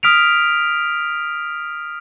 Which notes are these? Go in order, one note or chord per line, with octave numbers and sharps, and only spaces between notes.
D#6 F6 B6 D7 F7